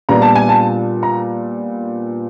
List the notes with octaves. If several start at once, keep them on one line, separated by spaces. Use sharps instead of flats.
A#2 G3 B3 D4 A#5
A5
G#5
A5
A#5